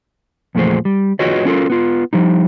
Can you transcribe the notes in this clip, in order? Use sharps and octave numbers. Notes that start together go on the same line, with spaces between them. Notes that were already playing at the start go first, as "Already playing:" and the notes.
E2 A#2 F3 A3 G#4 C5
G3
F4 F#4 G#4 B4 C#5 D#5
C#4 F4 A4 A#4
B3 F4
F3 G3 D#4